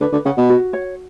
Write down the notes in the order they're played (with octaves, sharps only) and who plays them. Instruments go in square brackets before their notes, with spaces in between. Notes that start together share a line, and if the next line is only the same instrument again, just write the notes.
[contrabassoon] D3 [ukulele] B4
[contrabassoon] D3
[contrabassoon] C#3 [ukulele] F#5
[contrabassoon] B2
[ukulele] F#4
C#5